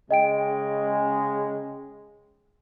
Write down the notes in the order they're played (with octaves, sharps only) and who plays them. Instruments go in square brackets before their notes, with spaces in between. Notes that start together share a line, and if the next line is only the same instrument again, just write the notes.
[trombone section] C#3 G#3 [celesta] D#5 G5 D7